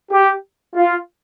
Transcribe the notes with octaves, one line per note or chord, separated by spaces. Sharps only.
G4
F4